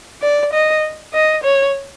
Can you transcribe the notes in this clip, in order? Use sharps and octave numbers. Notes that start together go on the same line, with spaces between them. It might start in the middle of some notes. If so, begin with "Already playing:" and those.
D5
D#5
D#5
C#5